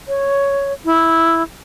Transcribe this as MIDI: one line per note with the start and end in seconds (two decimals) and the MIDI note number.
0.08 0.73 73
0.85 1.42 64